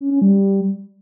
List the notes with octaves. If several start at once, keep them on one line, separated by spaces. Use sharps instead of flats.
C#4
C#4
G3